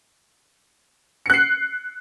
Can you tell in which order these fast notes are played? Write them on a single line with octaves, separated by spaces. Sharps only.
C#7 F#6 C7